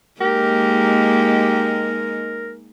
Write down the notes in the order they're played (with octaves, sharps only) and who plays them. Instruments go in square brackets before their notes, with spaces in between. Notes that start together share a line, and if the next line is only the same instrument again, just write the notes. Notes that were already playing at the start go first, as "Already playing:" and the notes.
[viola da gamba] G#3 A#3 D#4 [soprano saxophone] G4 [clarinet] A#4